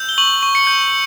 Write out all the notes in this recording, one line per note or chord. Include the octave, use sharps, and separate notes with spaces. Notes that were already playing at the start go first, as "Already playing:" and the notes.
Already playing: E6 G6
G7
C#6 F#7
C#6
C#7
G6